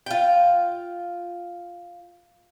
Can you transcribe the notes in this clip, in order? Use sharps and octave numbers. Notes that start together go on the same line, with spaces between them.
F4 G5